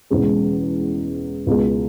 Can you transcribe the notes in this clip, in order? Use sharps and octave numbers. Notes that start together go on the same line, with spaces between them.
E1 E2 C#3 G#3
C#2 B2 G#3